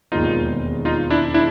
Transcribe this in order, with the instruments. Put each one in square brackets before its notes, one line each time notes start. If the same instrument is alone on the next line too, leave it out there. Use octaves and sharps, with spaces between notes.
[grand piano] E1 D#2 D#3 G#3 C4 [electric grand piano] D#4 F4
[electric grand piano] D#4 F4
D4 E4
D4 E4